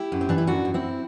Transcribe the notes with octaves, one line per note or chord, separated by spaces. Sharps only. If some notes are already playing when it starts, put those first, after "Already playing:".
Already playing: E4 G4
F#2
C4
E3 D4
E4
F#2 D4 F#4
F#2
C4 E4